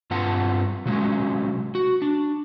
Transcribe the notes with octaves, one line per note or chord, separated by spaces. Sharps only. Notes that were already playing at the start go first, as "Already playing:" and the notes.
G2 C4 F4 F#5 A5
C3 F#3 G#3 C#4
F#4
D4